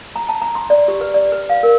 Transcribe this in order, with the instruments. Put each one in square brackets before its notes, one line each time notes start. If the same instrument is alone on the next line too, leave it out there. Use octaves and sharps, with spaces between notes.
[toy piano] A#5
A5
A#5
C6
D5
G4
B4
D5
B4
F5
A#4